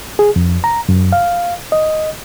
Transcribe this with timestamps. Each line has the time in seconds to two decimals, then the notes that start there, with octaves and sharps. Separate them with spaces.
0.19 G#4
0.36 F2
0.64 A#5
0.89 F#2
1.12 F5
1.72 D#5